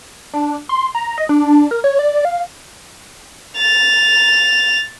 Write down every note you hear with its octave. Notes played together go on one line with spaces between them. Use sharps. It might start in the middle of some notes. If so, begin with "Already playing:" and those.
D4
C6
A#5
D#5
D4
A#4
C#5
D5
F5
A6 F7